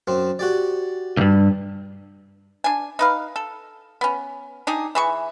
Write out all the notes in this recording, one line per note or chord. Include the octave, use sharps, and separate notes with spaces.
F#2 C4
F#4 G4 D5
C#2 G2
D4 G#5
D#4 B4 F5
A4
B3 C#4
D4 D#4 G4 G#4
E3 G#4 C#6